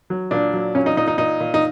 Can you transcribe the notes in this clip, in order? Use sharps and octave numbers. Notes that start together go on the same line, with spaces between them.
F#3
A#2 D4
F#3
A#2 C#4
D#4
A#2 D#4
D#4
A#2 D#4
A#2
D#4